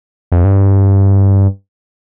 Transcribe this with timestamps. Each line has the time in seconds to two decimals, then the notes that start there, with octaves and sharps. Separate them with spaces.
0.32 F2
0.45 G2